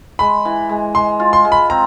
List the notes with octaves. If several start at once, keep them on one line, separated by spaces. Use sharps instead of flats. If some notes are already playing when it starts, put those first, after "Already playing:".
G#3 B5
E3
G#3
G#3 C6
F4
C6
G#3
B5
C4 A#5